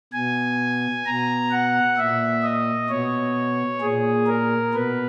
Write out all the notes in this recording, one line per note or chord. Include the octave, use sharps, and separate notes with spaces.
B2 G#5
B2 A#5
F#5
A#2 E5
D#5
B2 C#5
A#2 G#4
A#4
B2 B4